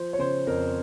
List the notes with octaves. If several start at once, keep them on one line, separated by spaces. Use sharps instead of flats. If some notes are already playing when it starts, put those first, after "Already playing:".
Already playing: F3 C5
C#5
C#3 C5
F2 A#4